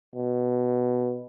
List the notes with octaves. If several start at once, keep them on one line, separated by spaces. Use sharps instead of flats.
B2